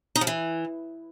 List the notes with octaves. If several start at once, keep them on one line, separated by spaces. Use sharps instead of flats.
D#4
F3
E3